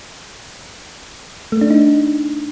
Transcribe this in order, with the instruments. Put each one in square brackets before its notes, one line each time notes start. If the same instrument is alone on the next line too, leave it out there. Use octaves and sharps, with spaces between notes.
[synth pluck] A3
D4
D#4